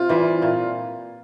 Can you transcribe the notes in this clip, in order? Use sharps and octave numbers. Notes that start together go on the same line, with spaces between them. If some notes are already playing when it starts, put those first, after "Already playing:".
Already playing: C3 F4
E3 G3
A#2